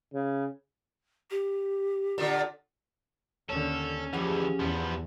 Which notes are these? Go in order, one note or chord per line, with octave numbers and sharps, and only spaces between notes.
C#3
G4
A#2 D3
D#2 D3 C#4 A4
D2 E3 F3 G4 G#4 F#5
E2 F3 B3